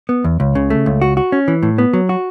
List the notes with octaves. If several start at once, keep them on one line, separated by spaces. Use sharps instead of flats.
B3
E2
C#2
C#3
A3
C#2
F#4
F#4
C#4
E3
A2
B3
F#3
F#4